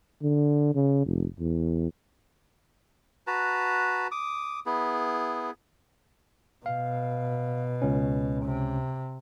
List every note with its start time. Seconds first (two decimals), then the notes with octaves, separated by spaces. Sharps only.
0.22 D3
0.75 C#3
1.05 F1
1.39 E2
3.27 F#4 B4 A5 A#5
4.11 D6 D#6
4.66 B3 E4 G#4
6.66 B2 F5
7.82 C#2 C#4
8.45 C3